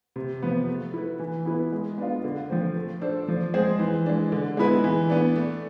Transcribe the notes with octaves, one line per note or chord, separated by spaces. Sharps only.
C3
F3 B3
A3
E4 B4
E3
B3 E4 B4
G#3
B3 D4 F4
D3
F3 A3 C4
A3
D4 A4 C5
F3
G#3 C4 G#4 C5
E3
G#3 D4
D3
G#3 B3 E4 B4
E3
B3 D4
A3